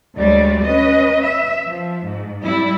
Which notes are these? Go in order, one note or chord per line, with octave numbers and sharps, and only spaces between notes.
D2 G3 G#3 C#5 D5
C#4 B4 D#5
E5
F3
G#2
G3 E4